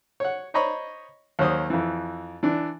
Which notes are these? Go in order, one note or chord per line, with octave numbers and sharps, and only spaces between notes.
C#5 F#5
C5 C#5 D#5 A#5 B5 C#6
D#2 F#3 C5 D#6
F2 E3
E3 D4